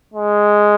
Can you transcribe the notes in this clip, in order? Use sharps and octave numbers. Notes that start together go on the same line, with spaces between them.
G#3